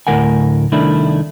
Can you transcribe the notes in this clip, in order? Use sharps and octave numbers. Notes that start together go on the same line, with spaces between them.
D2 A2 F3 A#4 F#5 G#5
C2 D#3 A3 D4 E4